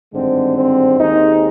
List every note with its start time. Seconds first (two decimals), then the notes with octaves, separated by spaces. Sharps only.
0.14 G#1 G2 D3 G#3 C4
0.57 C4
0.99 D#2 D#3 G#3 C4 D#4